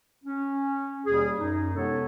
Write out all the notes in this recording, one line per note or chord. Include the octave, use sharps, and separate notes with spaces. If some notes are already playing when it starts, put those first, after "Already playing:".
C#4
D#2 B2 G3 G#4
F#2 D#4
C3 G#3 B3 A4 C#5